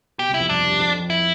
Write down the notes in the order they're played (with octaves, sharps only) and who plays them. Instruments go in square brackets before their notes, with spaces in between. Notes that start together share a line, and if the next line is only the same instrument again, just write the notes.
[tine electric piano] B2 [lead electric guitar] G4
[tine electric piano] C2 C3 [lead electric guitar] E4
[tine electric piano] F2 F3
[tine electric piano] G2 G3 [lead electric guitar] D4
[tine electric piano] G2 G3
F2 F3
F2 F3
[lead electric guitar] E4